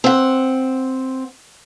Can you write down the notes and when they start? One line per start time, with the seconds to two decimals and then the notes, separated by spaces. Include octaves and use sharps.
0.04 C4 F#5